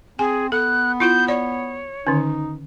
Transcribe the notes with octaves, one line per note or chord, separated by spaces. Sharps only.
C4 G#4 G#5
B3 A4 F#6
E4 F4 G6
C#5 D5
D3 D#3 C#4 D#4